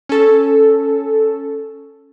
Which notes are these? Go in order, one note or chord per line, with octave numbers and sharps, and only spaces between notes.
C#4 A4